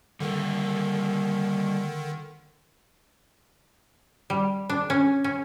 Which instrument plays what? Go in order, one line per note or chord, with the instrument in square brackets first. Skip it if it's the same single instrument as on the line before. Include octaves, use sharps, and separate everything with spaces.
[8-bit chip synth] D3 D#3 [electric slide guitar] G3 A#3 A4
[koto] G3
D4
C#4
C#4